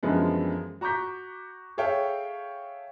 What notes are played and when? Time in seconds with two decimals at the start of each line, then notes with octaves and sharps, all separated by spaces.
0.03 F#2 D3 E3 F3 G#3 B3
0.81 F#4 A#5 C#6 D6 G6 B6
1.78 G#4 A4 C#5 E5 F5 G5